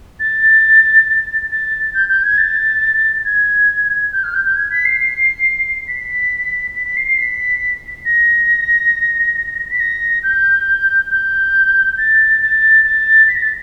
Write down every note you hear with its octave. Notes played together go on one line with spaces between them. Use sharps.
A6
A6
G6
G6
G#6
A6
G#6
G6
F6
G6
G6
G#6
B6
C7
C7
B6
B6
B6
C7
C7
B6
A#6
B6
A#6
G6
G6
A6
A6
A6
B6
A#6
A6